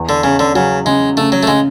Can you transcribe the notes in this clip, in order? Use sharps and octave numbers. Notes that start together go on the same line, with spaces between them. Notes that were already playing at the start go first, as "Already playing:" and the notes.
Already playing: E2
D3
C#3 C#4
D3
C#3 F#3
C#3 G#3
C#3 A3
F#3
A3
C#3 G#3